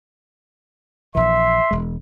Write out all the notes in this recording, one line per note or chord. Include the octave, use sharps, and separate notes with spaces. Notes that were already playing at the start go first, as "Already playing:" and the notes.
A#1 E3 E5 C6
E1 G#3